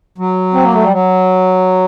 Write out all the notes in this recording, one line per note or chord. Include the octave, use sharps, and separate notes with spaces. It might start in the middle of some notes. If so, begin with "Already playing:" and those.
F#3
C4
A#3
A3
G3
F#3